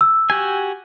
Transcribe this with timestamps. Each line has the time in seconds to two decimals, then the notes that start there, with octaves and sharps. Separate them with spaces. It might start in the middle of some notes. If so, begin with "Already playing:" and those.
0.01 E6
0.30 F#4 G4 G#5